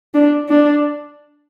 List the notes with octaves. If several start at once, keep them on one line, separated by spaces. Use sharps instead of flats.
D4
D4